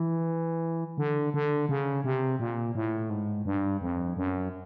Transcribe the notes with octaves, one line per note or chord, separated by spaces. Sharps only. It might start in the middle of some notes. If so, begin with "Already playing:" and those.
Already playing: E3
D3
D3
C#3
C3
A#2
A2
G#2
G2
F2
F#2